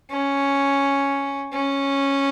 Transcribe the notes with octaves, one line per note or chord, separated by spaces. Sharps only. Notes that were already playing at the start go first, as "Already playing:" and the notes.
C#4
C#4